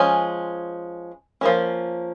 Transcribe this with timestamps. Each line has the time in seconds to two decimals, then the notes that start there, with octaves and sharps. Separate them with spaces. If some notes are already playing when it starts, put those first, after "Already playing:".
Already playing: F3 G#3 C#4 G#5
1.41 F3 A#3 C#4